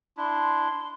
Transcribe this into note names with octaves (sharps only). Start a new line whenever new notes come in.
D4 E4 C6